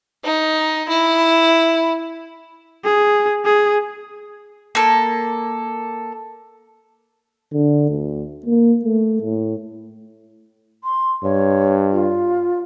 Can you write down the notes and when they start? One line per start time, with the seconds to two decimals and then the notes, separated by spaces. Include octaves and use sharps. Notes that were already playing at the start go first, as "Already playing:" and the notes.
0.24 D#4
0.89 E4
2.85 G#4
3.45 G#4
4.75 A#3 A4
7.53 D3
7.90 D2
8.46 A#3
8.85 A3
9.22 A2
10.84 C6
11.24 G2 C#5
11.92 F4